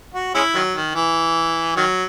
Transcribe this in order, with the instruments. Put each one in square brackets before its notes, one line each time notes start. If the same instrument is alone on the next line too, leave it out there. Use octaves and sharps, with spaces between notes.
[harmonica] F#4
G#3 C#4 E4
D#3 F#3
D#3
E3
D#3 F#3